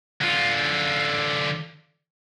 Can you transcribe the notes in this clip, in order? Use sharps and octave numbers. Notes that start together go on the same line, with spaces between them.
D3 F4